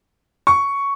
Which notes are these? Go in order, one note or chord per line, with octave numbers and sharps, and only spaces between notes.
C#6